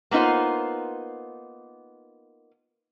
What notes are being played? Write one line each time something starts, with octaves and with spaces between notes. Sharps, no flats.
A#3 B3 D#4 F4 C5